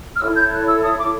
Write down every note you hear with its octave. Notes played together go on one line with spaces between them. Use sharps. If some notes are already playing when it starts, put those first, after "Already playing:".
F6
E4 A4 C#5 E6
G6
F#6
E6
D#6
D6